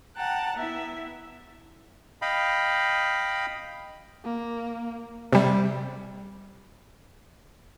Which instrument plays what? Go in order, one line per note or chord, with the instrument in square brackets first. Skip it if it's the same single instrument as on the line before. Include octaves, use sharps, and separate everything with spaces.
[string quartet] F#5 G5 A5 A#5 F#6
B3 E4 E5
[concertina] D#5 F5 G5 B5
[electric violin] A#3
[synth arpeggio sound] C3 G3